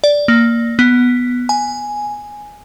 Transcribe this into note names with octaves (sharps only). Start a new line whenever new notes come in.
D5
A#3
B3
G#5